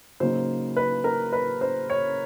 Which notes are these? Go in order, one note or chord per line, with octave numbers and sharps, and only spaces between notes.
C#3 F#3 A#3 D#4 C5
B4
A#4
B4
C5
C#5